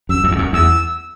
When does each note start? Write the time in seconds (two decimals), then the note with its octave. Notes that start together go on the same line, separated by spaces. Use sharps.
0.09 F#2 E6
0.24 F#2
0.32 E2
0.38 F#2
0.53 E2 E6